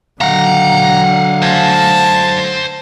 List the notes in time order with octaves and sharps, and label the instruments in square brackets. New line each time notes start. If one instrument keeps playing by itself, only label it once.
[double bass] D3 F#3 [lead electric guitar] F5 F#5 [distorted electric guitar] A#5
[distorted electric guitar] C5 G#5 [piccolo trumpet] A5